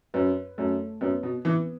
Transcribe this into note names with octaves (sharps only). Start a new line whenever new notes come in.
F#2 B4
F#2 A3
F#2 B3
B2
E3 B3